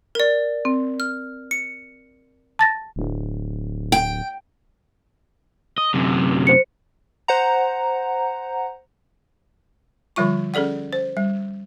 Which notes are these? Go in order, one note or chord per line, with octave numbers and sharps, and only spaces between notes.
A#4 D5
C4
F6
C#7
A5 A6 A#6
D1
G5
D#5
F#2 C3
C5 C#7
C5 F#5 A#5
D3 F3 G3 F4 C#6
C#4 G#4 A4 D5 F#5
C5
G3